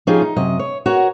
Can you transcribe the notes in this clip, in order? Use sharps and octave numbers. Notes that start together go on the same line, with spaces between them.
F3 C#4 D#4 F4 G4 G#4
D#4
F#2 C3 D#5
C#5
F#4 A#4 C#5